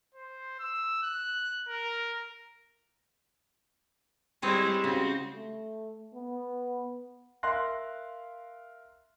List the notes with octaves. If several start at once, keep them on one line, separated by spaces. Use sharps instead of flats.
C5
E6
F#6
A#4
G3 G#3 C4 E4 G#4 C#5
C#3 C4 F#4
A3
B3
A#4 E5 F5 C6 F#6 A#6